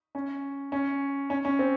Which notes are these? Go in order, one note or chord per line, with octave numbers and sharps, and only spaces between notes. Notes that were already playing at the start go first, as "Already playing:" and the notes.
C#4
C#4
C#4
C#4
C4